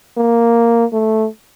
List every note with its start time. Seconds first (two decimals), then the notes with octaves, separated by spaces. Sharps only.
0.17 A#3
0.93 A3